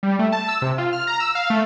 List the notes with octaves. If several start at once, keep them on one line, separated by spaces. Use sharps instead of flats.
G3
A3
A5
E6
C3
F4
F6
A#5
E6
F5
A3